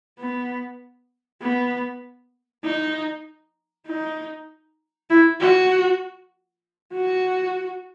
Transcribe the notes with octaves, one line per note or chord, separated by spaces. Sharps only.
B3
B3
D#4
D#4
E4
F#4
F#4